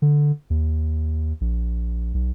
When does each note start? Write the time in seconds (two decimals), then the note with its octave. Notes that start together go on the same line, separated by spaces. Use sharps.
0.02 D3
0.50 D#2
1.41 A#1
2.14 B1